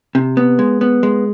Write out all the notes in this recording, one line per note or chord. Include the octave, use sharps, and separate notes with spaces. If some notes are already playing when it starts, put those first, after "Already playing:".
C3
B3
G#3
B3
G#3